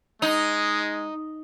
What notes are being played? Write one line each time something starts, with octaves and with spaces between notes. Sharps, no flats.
G#3 D#4